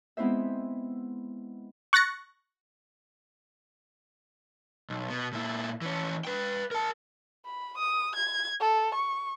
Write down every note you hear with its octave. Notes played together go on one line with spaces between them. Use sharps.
G#3 B3 C4 E4 C5 E5
C#6 F#6 A6 A#6 C#7
B1
B2
A#2 E4
E3 C#4
B4 G5
A#4 A5
B5
D#6
G#6
A4
C#6